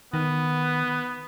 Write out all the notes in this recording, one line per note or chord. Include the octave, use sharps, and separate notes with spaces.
D#3 B3